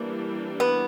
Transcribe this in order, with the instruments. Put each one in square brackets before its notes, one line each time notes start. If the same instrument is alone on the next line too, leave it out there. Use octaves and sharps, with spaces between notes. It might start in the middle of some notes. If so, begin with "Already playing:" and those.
Already playing: [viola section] E3 G3 A#3 D4
[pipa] B3